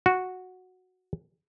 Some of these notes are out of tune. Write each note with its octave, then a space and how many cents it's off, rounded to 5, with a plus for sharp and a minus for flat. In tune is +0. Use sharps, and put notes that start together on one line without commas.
F#4 -5